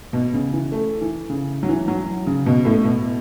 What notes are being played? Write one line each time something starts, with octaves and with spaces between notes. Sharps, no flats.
B2
C#3
E3
A3
E3
C#3
F#3
E3
F#3
C#3
B2
A2
B2